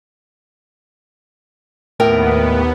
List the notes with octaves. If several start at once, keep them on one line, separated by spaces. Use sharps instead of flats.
D#2 A2 B3 A#4 G5